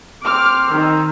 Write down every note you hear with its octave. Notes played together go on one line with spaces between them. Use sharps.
C4 D6 F6
D#3